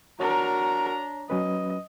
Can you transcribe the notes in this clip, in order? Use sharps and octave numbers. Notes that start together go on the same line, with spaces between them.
D4 F#4 A#4 C#5 A#5
F#3 C#4 B4 D#5